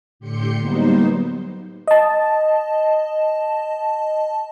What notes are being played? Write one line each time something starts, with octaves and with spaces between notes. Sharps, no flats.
A2 D3 G4 C6 G6 C#7
F#3 G3 A#3 B3 D#4 C5
D#5 A5